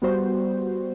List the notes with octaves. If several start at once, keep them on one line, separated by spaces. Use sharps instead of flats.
G3 B3 F#4 C5